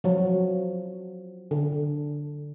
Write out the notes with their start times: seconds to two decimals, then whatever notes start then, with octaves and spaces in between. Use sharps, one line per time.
0.04 F3 F#3
1.51 D3